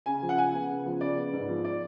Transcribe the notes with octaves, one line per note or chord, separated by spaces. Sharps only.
C#3 G#5
F3
F#5
C#3 G#5
B3
C#3
F3
C#3 D5
B3
G#2
F3
D5